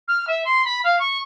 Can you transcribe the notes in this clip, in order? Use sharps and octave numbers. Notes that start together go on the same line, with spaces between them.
F6
E5
C6
B5
F5
C#6